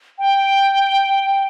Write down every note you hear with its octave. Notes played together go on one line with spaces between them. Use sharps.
G5